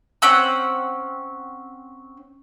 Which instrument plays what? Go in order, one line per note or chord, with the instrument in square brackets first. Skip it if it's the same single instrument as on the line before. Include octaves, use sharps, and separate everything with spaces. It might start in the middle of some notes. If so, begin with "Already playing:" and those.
[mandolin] C4 C#4 F#5 E6